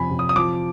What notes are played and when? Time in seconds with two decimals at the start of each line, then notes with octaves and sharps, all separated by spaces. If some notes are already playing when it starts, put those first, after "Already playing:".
Already playing: F2 C3 C4 G#5 B5
0.11 C3
0.19 D#6
0.29 D#6
0.36 F3 D6